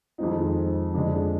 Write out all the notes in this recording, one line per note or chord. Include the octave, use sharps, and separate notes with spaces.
F2 D#3 G#3 C4 D#4
F2 D3 G#3 D4